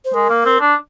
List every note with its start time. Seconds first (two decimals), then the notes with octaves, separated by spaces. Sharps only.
0.05 C5
0.14 G#3 A#4
0.29 A#3
0.45 C4
0.61 D4